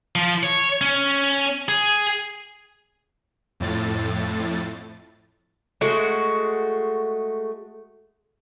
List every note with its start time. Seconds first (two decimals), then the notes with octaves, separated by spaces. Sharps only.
0.15 F3
0.43 C#5
0.81 C#4
1.68 G#4
3.60 F2 A2 A6
5.81 G#3 A3 F#4